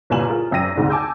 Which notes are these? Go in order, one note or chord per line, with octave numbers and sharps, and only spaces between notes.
G1 C2 A#2 G#5 E7 F#7
F4 G#4 A#4
G#1 F#2 G5 A#6 D#7
D2 G#2 C3 D4
G#5 A5 D6 E6 G6